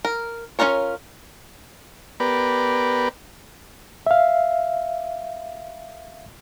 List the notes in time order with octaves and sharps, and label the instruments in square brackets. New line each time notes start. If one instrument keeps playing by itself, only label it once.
[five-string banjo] A#4
C#4 D#4 F4 A#4 C#5
[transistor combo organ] B3 G4 A#4 B4 D5
[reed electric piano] E5 F5